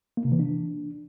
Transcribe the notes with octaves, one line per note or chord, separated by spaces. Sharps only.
A#3
C3
E3
D4